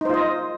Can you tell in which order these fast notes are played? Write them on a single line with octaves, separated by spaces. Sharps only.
D#4 C5 F4 D#5